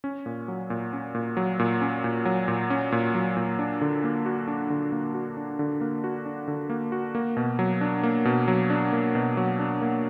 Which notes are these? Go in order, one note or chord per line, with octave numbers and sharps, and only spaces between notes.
C#4
A#2
F#3
A#2
C#4
A#2
F#3
A#2
C#4
A#2
F#3
A#2
C#4
A#2
F#3
A#2
D4
D3
A#3
F#4
D4
D3
A#3
F#4
D4
D3
A#3
F#4
D4
D3
A#3
F#4
A#3
B2
F#3
D4
A#3
B2
F#3
D4
A#3
B2
F#3
D4
A#3